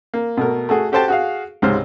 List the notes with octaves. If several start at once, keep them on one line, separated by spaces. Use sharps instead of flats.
A#3
B2 A3 A#4
A3 F#4 G#4
F#4 G4 A4 C5 G5 A5
F#4 G#4 F5
C#2 G#2 C3 C5 F6